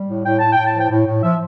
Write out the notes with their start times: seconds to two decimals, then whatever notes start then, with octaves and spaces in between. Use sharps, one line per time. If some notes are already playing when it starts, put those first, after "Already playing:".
Already playing: G3
0.09 A2
0.25 A2 G5
0.39 A2 A5
0.53 A2 G5
0.66 A5
0.75 F3
0.81 G5
0.90 A2
1.07 A2
1.23 F3 E5